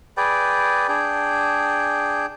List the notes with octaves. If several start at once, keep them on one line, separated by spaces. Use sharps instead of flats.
G#4 B4 D5 G5
D4 G#4 G5